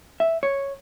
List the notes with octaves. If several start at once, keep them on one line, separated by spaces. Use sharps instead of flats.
E5
C#5